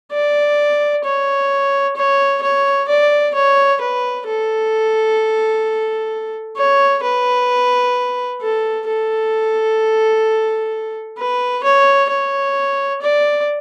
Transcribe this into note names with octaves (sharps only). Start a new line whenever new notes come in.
D5
C#5
C#5
C#5
D5
C#5
B4
A4
C#5
B4
A4
A4
B4
C#5
C#5
D5